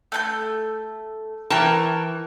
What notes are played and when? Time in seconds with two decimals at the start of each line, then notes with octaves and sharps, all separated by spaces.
0.12 A3 F#5 G6
1.50 E3 A#4 C#5 G5 A5